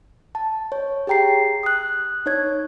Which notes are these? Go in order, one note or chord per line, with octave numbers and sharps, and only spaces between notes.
A5
C#5
G4 G#4 G5 A#5 C7
D#6 F#6
D#4 C#5 G#6